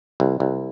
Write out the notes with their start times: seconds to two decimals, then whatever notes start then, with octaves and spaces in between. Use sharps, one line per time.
0.20 C2
0.40 C2